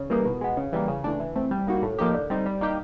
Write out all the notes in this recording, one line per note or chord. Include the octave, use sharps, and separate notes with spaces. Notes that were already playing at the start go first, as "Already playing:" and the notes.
Already playing: C#3
E3 G3 A#3 D#4
B2
G#3 B3
C#3
E3 G3 A#3
C#3
E3 A3 D4
E3
A3 C4
G3
A#3 D#4 F#4
A2
F3 A#3 D#4 G4
D3
G3 C4 D#4
G3
A#3 D#4 G4